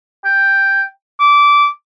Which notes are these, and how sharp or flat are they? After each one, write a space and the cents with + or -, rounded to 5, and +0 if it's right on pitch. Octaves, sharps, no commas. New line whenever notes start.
G5 +5
D6 -15